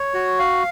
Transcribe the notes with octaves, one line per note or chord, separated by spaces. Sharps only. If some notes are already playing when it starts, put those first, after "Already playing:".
Already playing: C#5
F#4
F5